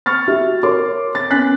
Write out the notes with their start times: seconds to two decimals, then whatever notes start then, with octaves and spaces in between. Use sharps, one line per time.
0.06 C#6 F6 A6
0.28 F#4 G4 E5
0.63 A#4 C#5 C6 D6
1.15 A6
1.31 B3 C#4 G#5 F#6 B6